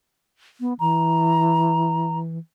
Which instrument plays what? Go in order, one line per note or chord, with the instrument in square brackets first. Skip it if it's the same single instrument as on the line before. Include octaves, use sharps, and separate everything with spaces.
[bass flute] B3
[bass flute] E3 [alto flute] A#5